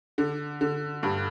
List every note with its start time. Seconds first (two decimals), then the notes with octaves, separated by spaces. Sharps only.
0.18 D3
0.61 D3
1.03 G2